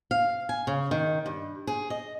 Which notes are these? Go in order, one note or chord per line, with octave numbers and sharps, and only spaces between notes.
F5
G#5
C#3
D#3
G2
G#4
D#5